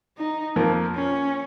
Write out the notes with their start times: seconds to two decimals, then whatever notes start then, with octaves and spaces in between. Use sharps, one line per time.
0.18 D#4
0.56 F2 F3 A#3
0.95 C#4